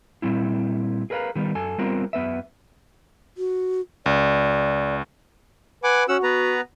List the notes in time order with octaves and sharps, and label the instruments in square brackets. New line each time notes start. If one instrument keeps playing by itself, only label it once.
[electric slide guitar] A#2 G3 C4 E4
G#4 A#4 B4 D5 F5 A#5
D#3 G3 B3
F#2 A4 G#5
G3 B3 C4 F4 A#4
F#2 B3 B4 E5
[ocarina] F#4
[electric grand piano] C#2 [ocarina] D5
[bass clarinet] B4 [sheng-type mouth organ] F#5 G#5 D6
[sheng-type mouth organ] C#4 F#5 E6 [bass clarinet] F#4
[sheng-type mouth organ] B3 B4 A#5